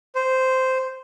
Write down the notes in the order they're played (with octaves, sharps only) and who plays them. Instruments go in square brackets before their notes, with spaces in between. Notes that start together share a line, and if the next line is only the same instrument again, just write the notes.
[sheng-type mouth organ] C5